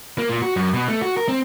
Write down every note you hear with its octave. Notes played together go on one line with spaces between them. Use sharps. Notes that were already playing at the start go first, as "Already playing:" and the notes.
A#3
A#2
F#4
F#2
B2
A3
F#4
A#4
C4